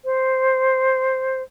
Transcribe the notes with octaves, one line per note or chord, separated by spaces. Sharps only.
C5